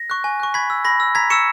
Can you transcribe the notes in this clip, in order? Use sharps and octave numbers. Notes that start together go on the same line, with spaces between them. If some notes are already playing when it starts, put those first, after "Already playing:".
Already playing: A#6
C#6 F#6
G#5
C#6 F#6
B5 G#6 B6
E6
B5 A#6
E6
A#5 G#6 B6
C#6 E6 C#7 E7